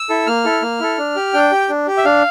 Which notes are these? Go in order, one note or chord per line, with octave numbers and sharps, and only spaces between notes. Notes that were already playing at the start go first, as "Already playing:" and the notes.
Already playing: E6
E4 A4
A#3 F6
E4 A4
A#3
E4 A4
D4
G4
D4 G5
G4
D4
G4
E5
D4 F5